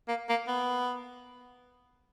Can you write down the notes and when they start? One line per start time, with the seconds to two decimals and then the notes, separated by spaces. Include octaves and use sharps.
0.08 A#3
0.29 A#3
0.48 B3